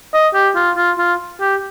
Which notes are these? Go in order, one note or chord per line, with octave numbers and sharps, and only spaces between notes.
D#5
G4
F4
F4
F4
G4